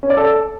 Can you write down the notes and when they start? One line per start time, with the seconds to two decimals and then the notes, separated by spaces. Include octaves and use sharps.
0.03 C#4
0.10 D5
0.17 A4